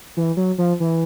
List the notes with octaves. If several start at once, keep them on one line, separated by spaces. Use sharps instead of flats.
E3
F#3
F3
E3